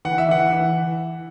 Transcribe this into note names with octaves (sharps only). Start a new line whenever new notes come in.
E3 F#5
E5
E3 F#5
E3